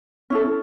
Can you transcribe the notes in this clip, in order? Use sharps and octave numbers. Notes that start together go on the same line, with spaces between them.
C#4 E4 A4